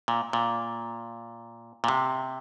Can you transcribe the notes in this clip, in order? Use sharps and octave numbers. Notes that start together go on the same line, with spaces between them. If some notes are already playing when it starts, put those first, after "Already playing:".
A#2
A#2
A#2
C3